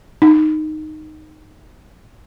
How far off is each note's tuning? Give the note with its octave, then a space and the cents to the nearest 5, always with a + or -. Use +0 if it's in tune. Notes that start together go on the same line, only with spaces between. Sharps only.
D#4 -10